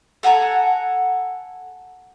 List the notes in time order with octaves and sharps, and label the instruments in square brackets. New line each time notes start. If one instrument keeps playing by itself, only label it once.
[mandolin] A4 F#5 G#5 A#5